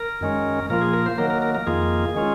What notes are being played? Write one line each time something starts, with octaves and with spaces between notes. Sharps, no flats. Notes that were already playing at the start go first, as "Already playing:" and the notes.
Already playing: A#4
F#2 D#3 G#3 C#4
A#2 F3 A#3 F4 A#4
G#4
A#4
C5
D#3 F#3 A#3 A#4
A#4
A#4
A#4
F2 D#3 A#3 F4 G#4
D#3 G#3 C#4 F4